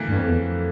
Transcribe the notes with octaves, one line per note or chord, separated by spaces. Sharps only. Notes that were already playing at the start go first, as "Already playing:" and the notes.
Already playing: D3 E3 A3 A#3
G2
F2
E2
F2